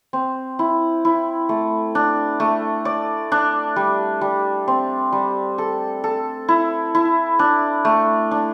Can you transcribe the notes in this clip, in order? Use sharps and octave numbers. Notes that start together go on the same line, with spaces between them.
C4
E4
E4
A3
D4
A3
D5
D4
G3
G3
C4
G3
A4
A4
E4
E4
D4
A3
D4